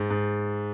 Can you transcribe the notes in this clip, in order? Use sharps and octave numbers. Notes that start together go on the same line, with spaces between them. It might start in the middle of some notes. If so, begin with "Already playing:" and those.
Already playing: G#2
G#2